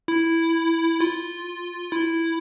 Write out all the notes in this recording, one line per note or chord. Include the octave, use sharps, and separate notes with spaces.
E4
F4
E4